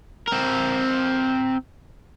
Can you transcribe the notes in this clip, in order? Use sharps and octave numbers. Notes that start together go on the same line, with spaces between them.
C4 A#4